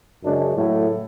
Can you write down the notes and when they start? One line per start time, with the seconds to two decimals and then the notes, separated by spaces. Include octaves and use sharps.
0.24 F#2 C#3 G#3 D4
0.57 A2 F#3 A3